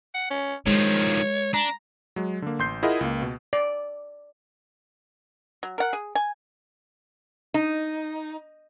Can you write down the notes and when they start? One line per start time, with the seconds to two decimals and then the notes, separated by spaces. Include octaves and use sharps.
0.14 F#5
0.30 C#4
0.66 D#3 F3 G#3 C#5
1.54 D4 A#5
2.16 F#3 G#3
2.42 D3 A#3
2.59 A1 C6 G6 C7
2.83 E4 F4 G#4 A#4 D#5 F#5
3.01 C#2 A#3
3.22 B2
3.53 D5
5.63 F#3
5.78 A#4 F#5
5.93 G#4
6.15 G#5
7.54 D#4